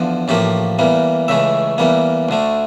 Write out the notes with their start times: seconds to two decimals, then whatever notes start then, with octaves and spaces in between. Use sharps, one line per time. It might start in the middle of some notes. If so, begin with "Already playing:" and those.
Already playing: E2 D3 F3
0.28 A1 A2 F3 A#3 G4
0.79 E2 E3 G3 A#3
1.28 C#2 C#3 E3 A3 E5
1.78 E2 E3 G3 A#3
2.29 D2 D3 A3